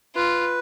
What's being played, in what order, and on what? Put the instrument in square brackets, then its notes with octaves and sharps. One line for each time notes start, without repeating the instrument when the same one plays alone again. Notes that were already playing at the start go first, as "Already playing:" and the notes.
[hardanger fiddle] F4 [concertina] B4